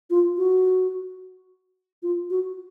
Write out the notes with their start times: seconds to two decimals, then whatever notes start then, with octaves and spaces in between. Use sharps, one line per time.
0.10 F4
0.38 F#4
2.03 F4
2.30 F#4